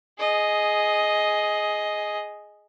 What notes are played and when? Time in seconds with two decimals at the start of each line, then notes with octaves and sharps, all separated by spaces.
0.18 G#4 D#5